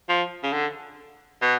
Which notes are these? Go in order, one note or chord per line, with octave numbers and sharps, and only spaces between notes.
F3
C#3
D3
B2